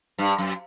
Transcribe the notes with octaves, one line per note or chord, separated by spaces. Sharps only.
G2
F#2